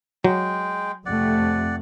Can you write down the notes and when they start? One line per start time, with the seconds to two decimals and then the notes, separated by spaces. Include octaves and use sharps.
0.24 F#3 G#3 G5
1.06 F2 C3 A3 D5 F#5